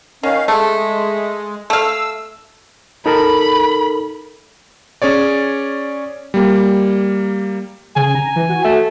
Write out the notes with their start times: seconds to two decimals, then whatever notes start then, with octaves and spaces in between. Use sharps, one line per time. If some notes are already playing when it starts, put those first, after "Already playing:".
0.23 D#3 C#4 F5
0.48 G#3 A3
1.70 A3 F5 E6
3.06 D#4 A4 A#4 B5
5.02 C#4 G#4 C#5 D5
6.34 G3 A#3
7.96 C#3 G#5
8.15 A#5
8.36 E3
8.49 F#4
8.65 A3